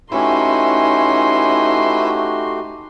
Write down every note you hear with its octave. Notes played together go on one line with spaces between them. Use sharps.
A3 C#4 D#4 E4 F#4 G4 B4 C6